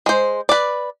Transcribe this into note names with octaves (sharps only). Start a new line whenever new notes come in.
G#3 C5
B4 D5